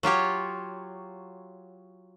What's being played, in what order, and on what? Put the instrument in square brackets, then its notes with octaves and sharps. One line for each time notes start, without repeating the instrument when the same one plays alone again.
[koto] F#3 F4 G4 C#5